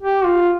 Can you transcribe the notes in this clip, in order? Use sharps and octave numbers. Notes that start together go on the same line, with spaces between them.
G4
F4